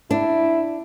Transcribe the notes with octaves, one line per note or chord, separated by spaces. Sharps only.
D4 E4